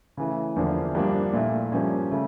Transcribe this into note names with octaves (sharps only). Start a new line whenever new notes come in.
C#3 E3 A3
E2 D3 F3 A#3 E4
G2 F3 A#3 D4
A#2 A3 E4
G2 F3 A#3 C#4
C#3 A3